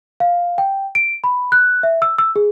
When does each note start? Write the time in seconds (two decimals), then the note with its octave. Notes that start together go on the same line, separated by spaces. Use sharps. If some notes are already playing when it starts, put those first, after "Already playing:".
0.20 F5
0.58 G5
0.95 D7
1.24 B5
1.52 F#6
1.83 E5
2.02 E6
2.18 E6
2.36 G#4